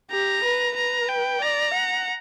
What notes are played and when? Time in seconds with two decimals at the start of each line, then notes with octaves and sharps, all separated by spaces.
0.11 G4 A#5
0.43 B4
0.76 B4 A#5
1.08 G5
1.41 D5 A#5
1.74 F#5